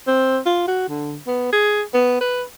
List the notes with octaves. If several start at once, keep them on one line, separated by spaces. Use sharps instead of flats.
C4
F4
F#4
D3
B3
G#4
B3
B4